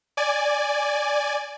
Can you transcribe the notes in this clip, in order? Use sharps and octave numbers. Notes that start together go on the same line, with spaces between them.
D5 G#5